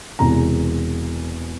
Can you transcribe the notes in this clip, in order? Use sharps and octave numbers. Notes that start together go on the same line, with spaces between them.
E1 E2 C3 E3 A#5